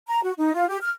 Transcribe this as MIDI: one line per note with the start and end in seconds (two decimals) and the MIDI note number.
0.07 0.20 82
0.23 0.32 66
0.37 0.51 63
0.54 0.66 65
0.68 0.77 67
0.82 0.91 89